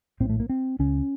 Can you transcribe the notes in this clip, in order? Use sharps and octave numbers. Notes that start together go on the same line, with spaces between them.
A#1 A2 C4
A3
A#3
C4
C#2 C#3 C#4